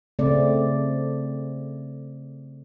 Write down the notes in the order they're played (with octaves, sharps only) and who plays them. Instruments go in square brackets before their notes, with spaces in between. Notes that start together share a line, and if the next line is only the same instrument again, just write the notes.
[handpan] C#3 A3 C4 D5